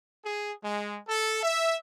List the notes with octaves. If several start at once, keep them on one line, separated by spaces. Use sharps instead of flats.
G#4
G#3
A4
E5